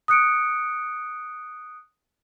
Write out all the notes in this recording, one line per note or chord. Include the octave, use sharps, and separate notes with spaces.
D#6 F#6 C#7 D7